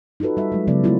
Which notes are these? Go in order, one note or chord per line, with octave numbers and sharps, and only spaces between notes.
D#4 F4 F#4 A4 B4
G3 E5
F#3 G#3
C#3 F#3 G#3 B3 D5
G#3 A3 B3 C#4 E4 F4